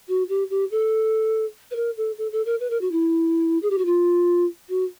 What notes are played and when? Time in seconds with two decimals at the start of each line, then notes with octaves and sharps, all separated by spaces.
0.08 F#4
0.29 G4
0.50 G4
0.71 A4
1.71 B4
1.76 A#4
1.97 A4
2.18 A4
2.32 A4
2.46 A#4
2.60 B4
2.70 A#4
2.81 F#4
2.92 E4
3.62 G#4
3.70 G4
3.78 F#4
3.85 F4
4.69 F#4